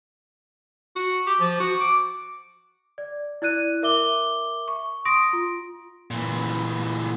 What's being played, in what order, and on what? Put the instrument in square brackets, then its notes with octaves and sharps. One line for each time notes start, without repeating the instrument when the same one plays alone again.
[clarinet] F#4
G4
F3
F#4
D6
[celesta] D5
E4 D5 F#6 D#7
A#4 E5 D6 G7
C#6
C6 D#6 A#6 D7
F4
[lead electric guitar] A#2 E3